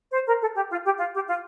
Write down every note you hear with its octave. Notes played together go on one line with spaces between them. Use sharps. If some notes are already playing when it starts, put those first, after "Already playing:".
C5
A#4
A4
G4
F4
G4
F4
G4
F4